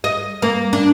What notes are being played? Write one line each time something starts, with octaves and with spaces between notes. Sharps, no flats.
D#5
A#3
D4